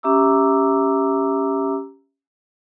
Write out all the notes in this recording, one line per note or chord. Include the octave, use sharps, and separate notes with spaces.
C#4 G4 E5 A#5 D6 E6